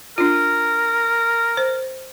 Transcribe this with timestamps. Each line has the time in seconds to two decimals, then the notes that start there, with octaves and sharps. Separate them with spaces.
0.18 D4 F4 A#4
1.57 C5